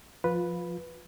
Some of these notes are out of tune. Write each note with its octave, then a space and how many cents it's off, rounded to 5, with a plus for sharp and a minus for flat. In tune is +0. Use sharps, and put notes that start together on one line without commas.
F3 +0 F4 +20 B4 +0